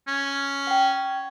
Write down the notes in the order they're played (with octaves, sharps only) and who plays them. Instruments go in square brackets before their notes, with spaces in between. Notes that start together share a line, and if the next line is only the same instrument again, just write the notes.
[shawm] C#4
[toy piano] F#5 G5